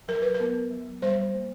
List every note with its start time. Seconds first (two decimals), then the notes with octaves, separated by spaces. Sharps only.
0.08 F#3 A#4
0.22 B4
0.34 A#4
0.40 B3
0.71 F#3
1.02 G3 C5
1.34 A#3